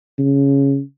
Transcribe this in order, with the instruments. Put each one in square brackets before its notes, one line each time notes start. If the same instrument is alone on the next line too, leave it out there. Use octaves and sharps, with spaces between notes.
[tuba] C#3